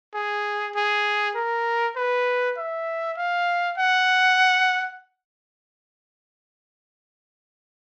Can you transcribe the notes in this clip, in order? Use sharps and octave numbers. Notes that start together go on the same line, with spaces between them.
G#4
G#4
A#4
B4
E5
F5
F#5